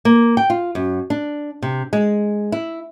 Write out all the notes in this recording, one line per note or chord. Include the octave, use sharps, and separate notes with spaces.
A#3
G5
F4
F#2
D4
C3
G#3
E4